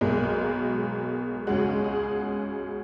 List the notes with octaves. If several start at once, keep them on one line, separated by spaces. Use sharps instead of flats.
B1 B2 G#3 A#4
C#2 C#3 G#3 F#4
G#4